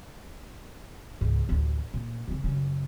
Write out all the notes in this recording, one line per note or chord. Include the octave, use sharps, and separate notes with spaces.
C#2 G#2
A1 D2
A#2
F2 C#3
F#2 C#3